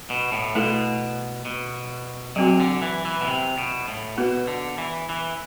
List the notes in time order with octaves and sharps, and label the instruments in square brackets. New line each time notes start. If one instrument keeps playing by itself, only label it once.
[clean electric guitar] B2
A2
[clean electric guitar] B2 [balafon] A3 E4 A4
[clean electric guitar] B2
[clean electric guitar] C3 [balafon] F#3 C4 F#4
[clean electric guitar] D3
E3
E3
B2
C3
B2
A2
[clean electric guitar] B2 [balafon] B3 F#4 B4
[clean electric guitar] D3
E3
E3